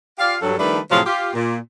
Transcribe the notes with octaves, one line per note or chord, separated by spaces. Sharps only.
F4 G4 D5 F5
G2 F#3 A4
D#3 F3 G3 A3 D4 B4
A2 C3 F3 F#3 F4 G#4
F4 G4
A#2